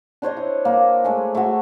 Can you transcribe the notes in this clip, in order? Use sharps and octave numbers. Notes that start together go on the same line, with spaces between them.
D4 C5 C#5 D#5
E4
A#3
G#3 A3 E5 G#5
A3 F#4